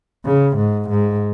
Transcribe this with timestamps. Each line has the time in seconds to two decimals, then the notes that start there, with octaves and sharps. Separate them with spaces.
0.26 C#3
0.58 G#2
0.90 G#2